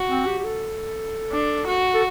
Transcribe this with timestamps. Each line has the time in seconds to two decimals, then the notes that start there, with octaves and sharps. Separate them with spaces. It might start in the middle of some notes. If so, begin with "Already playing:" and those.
Already playing: F#4
0.10 C4
0.26 G4
0.39 G4
0.44 A4
1.32 D4
1.67 F#4
1.94 A4